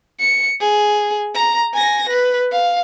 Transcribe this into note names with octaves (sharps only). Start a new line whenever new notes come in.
C#7
G#4
A#5
G#5 A#6
B4
F5